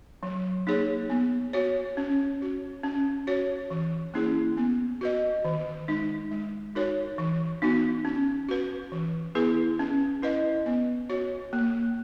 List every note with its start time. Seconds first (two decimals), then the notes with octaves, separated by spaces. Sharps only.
0.23 F#3
0.67 A#3 D#4 G#4 C#5
1.10 B3
1.53 F#4 C#5
1.97 C#4
2.40 F#4 C#5
2.83 C#4
3.27 F#4 C#5
3.70 E3
4.14 A#3 C#4 E4 G#4
4.57 B3
5.01 F#4 B4 D#5
5.45 D#3
5.88 G#3 D#4
6.31 G#3
6.75 D#4 F#4 A#4 C#5
7.18 E3
7.62 B3 D#4 F#4
8.05 C#4
8.49 F#4 B4
8.92 E3
9.35 B3 E4 G#4 B4
9.79 C#4
10.23 E4 B4 D#5
10.66 B3
11.10 F#4 C#5
11.53 A#3